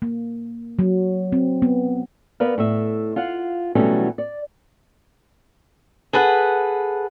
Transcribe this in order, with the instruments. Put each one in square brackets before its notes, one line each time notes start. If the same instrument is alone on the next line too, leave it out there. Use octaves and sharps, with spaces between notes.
[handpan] A#3
F#3
C4
B3
[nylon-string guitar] B3 A#4 B4 D5 F5
A2 E5
F4 F5 F#5
B2 E3 F#3 G3 A3 C#4
D5
[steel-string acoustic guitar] G#4 A4 B4 F#5